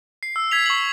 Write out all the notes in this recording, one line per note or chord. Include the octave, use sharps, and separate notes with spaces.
C7
E6
G#6 B6 F7
C#6 F#7